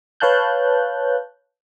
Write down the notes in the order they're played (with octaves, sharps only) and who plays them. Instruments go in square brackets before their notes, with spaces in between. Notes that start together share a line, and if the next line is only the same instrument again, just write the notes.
[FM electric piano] B4 C#5 F5 A5 F#6 G6